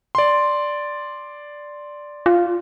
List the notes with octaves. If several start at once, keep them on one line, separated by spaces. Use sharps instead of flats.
D5 C6
F4